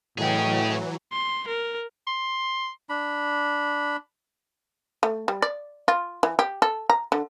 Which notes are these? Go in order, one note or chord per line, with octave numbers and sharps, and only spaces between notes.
A2 E3 F#3 C#4 G#4 D#5 G5
C6
A#4
C6
D4 B5
A3
G3
D5
F4
E3
G4
A4
A#5
D3